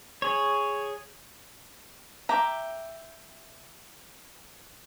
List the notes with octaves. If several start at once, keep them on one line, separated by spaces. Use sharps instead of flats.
G#4 C#5
E5 G5 A#5 D6